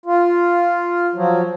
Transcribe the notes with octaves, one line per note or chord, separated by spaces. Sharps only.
F4
F3 F#3